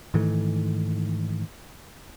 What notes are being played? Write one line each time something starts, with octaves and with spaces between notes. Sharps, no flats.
G#2 D#3 E3 A3